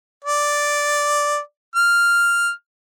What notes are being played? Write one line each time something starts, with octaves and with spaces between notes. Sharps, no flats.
D5
F6